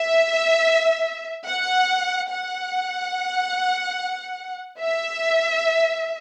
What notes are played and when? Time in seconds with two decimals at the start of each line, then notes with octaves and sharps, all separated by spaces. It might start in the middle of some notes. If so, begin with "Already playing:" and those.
Already playing: E5
1.46 F#5
2.30 F#5
4.79 E5